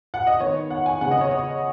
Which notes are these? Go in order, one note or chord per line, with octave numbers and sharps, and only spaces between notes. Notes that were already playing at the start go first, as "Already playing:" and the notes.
F#5
D#5
D#3 B3 C#5
F#5
G#5
C#3 B3 F#5
D#5
C#5
D#5